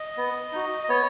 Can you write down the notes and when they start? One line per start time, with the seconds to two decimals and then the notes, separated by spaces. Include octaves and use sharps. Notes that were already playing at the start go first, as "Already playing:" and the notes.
Already playing: D#5
0.17 B3
0.52 D#4 F#4
0.84 D#5
0.89 B3 C#5